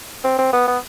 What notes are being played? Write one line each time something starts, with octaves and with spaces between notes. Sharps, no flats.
C4
C4
B3
B3